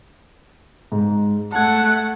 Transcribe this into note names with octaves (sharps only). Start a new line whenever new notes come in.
G#2
A3 F#5 A5 G#6